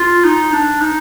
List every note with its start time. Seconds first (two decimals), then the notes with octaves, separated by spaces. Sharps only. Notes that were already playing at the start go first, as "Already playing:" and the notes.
Already playing: F4
0.25 D#4
0.53 D4
0.81 D#4